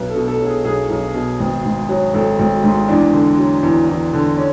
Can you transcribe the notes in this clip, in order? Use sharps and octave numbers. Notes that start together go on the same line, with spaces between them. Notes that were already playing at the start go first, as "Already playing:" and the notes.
Already playing: B1 B4
A4
B2
A4
F#3
G#4
B1 G#4
B1
B2
G#1
G#2
F#3
G#1 A4
G#1
G#2
E2 D4
D3
F#3
E2
E2
D3
C#4